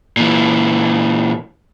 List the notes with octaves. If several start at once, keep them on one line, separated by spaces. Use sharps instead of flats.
A#2 E3